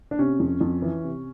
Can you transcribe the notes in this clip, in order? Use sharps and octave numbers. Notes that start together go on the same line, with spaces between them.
D4
C3 C#4
F2
F2
E3
C3